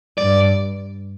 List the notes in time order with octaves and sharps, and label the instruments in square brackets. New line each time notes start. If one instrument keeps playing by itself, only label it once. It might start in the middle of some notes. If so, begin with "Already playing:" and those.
[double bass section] G2 [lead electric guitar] D5